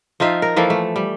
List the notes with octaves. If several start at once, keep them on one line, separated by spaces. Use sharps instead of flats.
F3 D#4 F4 E5
A#4
E3 F3 A#3 A4
A3
G3